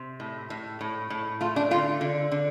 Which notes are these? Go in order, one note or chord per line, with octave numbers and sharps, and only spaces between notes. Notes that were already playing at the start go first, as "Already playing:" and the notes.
Already playing: C3
A2
A2
A2
A2
A3 F4
D4
D3 F4
D3
D3